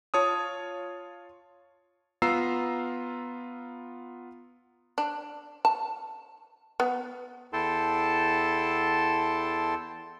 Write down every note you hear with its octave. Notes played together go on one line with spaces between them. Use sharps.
F4 C#5 A5 D#6
B3 F4 A#5 E6 C7
D4
A5
B3
E2 E4 A4 G5 A5 C6